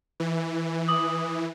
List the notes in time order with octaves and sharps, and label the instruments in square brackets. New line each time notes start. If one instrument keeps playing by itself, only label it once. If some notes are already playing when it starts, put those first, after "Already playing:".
[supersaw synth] E3
[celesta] D6 D#6 F#7